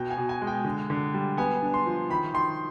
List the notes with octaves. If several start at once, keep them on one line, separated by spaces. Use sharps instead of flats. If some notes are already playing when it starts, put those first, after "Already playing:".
Already playing: B2 G5
G#5
B2
G#5
G#3
G5
D3
D3
G3
B3 G#5
D4
C6
F3
D#3 B5
D#3 C6